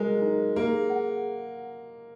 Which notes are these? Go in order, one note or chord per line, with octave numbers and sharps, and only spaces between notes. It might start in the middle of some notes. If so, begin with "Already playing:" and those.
Already playing: F#3 G#3 A#4
D#4
A#3 G#4
F#5